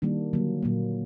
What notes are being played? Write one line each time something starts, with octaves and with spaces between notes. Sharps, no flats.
D#3 G3 A#3 D4
D3 F#3 A#3
A#2 F#3 A#3